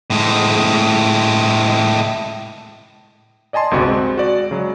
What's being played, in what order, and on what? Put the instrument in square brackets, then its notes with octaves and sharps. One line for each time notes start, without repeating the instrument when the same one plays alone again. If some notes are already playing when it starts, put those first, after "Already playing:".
[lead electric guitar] A2 G#3
[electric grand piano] D5 D#5 G#5 A5 C6
G1 C#2 C3 F#4 B5
G#3 C4 F#4
F#4 D5
C#3 F#3 G#3